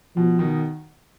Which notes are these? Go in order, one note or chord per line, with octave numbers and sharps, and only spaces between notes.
B2 F3
B2 D#3